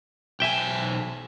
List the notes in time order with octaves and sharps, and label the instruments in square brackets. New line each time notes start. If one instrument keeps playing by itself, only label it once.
[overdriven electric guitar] B1 G#5 [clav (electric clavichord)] E5 G5